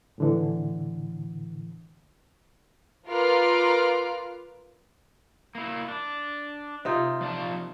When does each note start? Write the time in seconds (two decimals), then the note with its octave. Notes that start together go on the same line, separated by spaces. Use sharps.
0.18 A2 D3 E3
3.07 F4 A#4 B4 D6 F6
5.55 A#3 E4
5.89 D4
6.85 C3 D#4 F4
7.21 F3 D5 A5